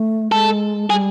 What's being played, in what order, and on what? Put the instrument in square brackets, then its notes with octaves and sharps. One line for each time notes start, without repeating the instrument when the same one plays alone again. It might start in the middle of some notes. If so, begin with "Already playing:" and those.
Already playing: [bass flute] A3
[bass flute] G#3 [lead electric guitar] A4
[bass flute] G3 [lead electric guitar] G#4